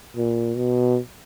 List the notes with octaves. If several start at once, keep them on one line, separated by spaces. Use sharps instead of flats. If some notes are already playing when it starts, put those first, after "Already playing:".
A#2
B2